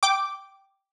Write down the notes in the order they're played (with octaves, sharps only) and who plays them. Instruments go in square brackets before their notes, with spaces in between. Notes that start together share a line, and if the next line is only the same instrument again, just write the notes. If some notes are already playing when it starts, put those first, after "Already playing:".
[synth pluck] G5 D6